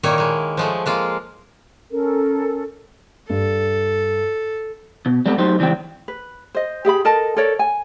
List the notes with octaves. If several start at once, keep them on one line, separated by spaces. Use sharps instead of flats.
A#2 D#3 A#3 E4 C#5
G#3 A#3
F3 G#3 A3
G#3 A#3 F4
C#4 A4 A#4
G2 A4
B2
G3 G#3 B3 C4 A4
F#3 A3 D#4 G4 C5
C#2 E3 G3 C4 G5
B4
C5 D#5
G4 G#4 E5 B5
A4 A#4 D#5 A5
A4 A#4 C#5 D5
G#5